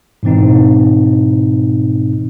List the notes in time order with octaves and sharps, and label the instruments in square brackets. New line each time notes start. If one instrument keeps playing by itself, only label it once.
[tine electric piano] G#2 B2 E3 C4 D#4